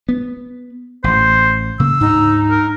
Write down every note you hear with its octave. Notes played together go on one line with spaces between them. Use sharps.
B3
A1 C5
C#3 A#3 E6
D2 G#2 D#4
A#4